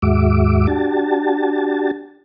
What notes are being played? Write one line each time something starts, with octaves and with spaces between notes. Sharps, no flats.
D#2 G#2 G#3 F#4 E5 D6
D4 F#4 G4 A5